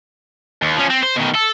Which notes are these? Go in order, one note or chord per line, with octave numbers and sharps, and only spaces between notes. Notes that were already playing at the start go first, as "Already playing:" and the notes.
D#2
F3 C#4
C4
C5
B2 D#3
A4